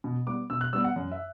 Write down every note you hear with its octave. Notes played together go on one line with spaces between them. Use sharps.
B2
G3 B3 D6
B2 E6
F#6
G3 B3 E6
F#5
F#2
E5